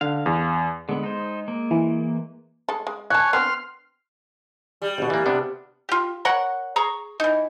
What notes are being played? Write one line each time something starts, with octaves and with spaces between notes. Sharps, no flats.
D3 F5
E2
D3 G#3 B3
D#4 C5
A#3
E3
G#3 A4
G#3
C#5 F5 G#5 A5 F#6
B3 C4 D4 C6 F6
G3
G#1 B2
E3 A#3
C3 B3 D4
F4 G4
A#4 C#5 F#5
G#4 A#5 C#6
E3 D#4